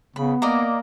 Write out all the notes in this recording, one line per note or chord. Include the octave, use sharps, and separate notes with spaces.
C#3 B3 B5
A#3 D5 D#5 A#5